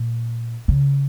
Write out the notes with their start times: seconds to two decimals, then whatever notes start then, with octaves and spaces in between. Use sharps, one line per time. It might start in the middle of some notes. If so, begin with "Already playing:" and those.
Already playing: A#2
0.68 C#3